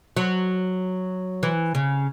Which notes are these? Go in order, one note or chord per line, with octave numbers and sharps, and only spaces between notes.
F#3
E3
C#3